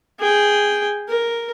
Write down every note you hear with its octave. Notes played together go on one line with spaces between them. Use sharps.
G#4 G5
A#4